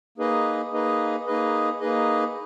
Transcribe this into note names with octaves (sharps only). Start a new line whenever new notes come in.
A#3 D#4 G#4 B4 D#5
A#3 D#4 G#4 B4 D#5
A#3 D#4 G#4 B4 D#5
A#3 D#4 G#4 B4 D#5